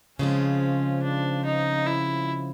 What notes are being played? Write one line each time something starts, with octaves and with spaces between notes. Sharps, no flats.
C#3 F3 G#3 C4 C#4 F4
D4
D#4
E4